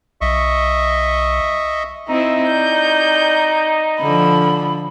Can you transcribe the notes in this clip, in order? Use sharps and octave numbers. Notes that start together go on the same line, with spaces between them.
B1 D#5 E5 C#6
C4 D#4 E4 C5 E5
D5 G6
D3 F3 B5